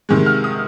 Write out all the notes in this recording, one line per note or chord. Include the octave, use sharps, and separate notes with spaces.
C3 D#3 G#3
F6
D#6